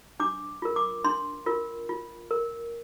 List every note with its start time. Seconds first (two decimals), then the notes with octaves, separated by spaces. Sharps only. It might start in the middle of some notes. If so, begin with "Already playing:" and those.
0.20 D4 D6
0.62 F4 A#4
0.76 D6
1.04 D4 C6
1.46 F4 A#4
1.89 F4
2.31 A#4